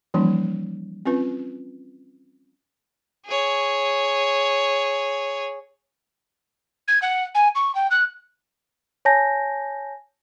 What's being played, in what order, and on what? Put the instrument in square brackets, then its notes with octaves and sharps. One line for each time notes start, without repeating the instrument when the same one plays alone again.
[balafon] E3 F3 G3 A#3 C#4 D#4
C4 C#4 F4 B4
[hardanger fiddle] G#4 C#5
[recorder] G#6
F#5
G#5
C#6
G5
F#6
[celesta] C#5 G#5 A5 G6 A#6